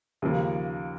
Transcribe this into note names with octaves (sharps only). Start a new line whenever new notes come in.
D#2 C#3 F3 A#3